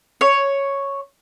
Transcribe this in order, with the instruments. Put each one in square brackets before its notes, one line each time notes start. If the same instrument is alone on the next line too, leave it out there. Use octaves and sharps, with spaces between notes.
[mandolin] C#5